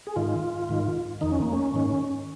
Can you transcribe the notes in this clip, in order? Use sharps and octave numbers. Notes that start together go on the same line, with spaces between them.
G#4
G#2 D#3 F4
G#2 D#3
F2 D#3 D#4
C#4
A#3
C#4
G#2 D#3